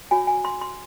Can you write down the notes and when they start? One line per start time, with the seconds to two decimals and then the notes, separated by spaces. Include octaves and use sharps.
0.11 F#4 C#5 G#5
0.27 G#5
0.45 C6
0.62 C6